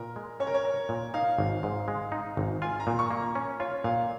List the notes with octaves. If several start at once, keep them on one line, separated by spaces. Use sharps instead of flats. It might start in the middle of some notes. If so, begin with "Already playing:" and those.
Already playing: A#2 A#4
G#3
C#4 C#5
A#4
C#5
A#4
A#2
D#4 F5
G#1
G#2
G#3
D#4
G#1
F4 G#5
A#5
A#2
C#6
A#3
A#5
C#4
F4 C#5
A#2 F5